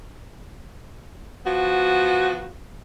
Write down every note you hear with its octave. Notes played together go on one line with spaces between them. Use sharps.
F3 B3 F#4